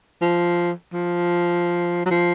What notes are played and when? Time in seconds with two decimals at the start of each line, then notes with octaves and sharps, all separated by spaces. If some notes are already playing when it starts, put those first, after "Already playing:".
0.21 F3
0.93 F3
2.05 F#3
2.10 F3